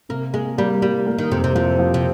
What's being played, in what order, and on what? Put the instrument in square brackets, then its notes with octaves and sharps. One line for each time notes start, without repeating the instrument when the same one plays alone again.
[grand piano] C3 [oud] A#3
[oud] G#3 [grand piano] A#3
[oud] G3 [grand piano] A#3
[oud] G3 [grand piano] A#3
[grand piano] A#3
[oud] D#3
[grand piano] F2 [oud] C3
[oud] C3
[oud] C3 [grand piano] F3
[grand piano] F3
[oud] C3